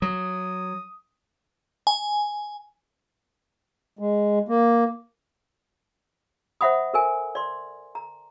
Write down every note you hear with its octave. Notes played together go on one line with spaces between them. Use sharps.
F#3 D#6
G#5
G#3
A#3
C5 E5 F#5 B5 D#6
A4 A#4 G#5
D5 C6
A#5